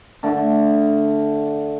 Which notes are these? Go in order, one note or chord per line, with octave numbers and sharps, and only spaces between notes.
D3 A3